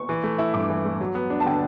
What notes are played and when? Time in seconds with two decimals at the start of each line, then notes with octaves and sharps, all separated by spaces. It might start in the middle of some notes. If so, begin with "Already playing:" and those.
Already playing: C#6
0.09 E3
0.24 A3
0.38 E4
0.54 G2 D6
0.70 E3
0.85 A3
1.01 F#3
1.15 B3
1.30 D4
1.40 A5
1.46 D3 G5